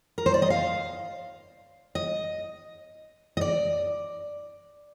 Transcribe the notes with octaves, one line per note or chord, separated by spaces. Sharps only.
A#4
C5
D5
D#5
F5
D#5
D#5
D5